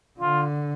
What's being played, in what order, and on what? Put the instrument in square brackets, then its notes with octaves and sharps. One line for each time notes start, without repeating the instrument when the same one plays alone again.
[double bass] D3 [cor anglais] F4